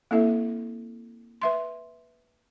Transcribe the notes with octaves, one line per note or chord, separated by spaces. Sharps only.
A#3 C4 E4 A4 E5
B4 E5 C6